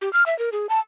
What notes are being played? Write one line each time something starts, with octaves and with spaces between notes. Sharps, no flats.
G4
F6
E5
A#4
G#4
A5